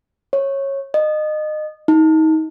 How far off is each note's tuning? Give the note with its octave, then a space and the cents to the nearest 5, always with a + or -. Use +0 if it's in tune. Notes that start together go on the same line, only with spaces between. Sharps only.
C#5 -15
D#5 -25
D#4 +30